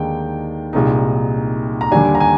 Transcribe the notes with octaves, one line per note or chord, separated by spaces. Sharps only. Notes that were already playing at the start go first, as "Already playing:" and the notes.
Already playing: D#2 D3 G#3 D#4 G5
C2 A#2 G#3 D#4
A#5
D#2 D3 G3 D4 G#5
A#5
G#5